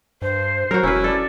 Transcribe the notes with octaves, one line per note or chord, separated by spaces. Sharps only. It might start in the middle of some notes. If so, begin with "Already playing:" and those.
G2 C5
F#3 F#4 A#4
E1 C#4 E4 B4
A4 D5